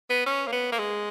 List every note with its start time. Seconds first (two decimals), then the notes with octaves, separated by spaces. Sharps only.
0.10 B3
0.26 C#4
0.47 A#3
0.52 B3
0.72 A#3
0.79 G#3